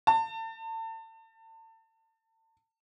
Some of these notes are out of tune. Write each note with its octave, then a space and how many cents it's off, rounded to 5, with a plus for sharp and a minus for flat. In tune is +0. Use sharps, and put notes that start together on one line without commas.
A5 +35